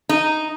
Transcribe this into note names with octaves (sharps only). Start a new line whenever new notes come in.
D#4